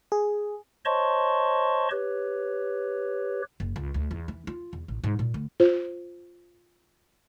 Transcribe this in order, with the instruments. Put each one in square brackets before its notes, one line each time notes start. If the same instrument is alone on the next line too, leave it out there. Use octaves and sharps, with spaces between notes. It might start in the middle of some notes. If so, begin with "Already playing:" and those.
[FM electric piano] G#4
[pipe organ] C5 C#5 D#5 A5 C6 C#6
G4 B4 C#5
[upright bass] F#1
C#2
D2
E2
E3
F4
E2
A1
G#2
A#2
D2
[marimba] F4 C5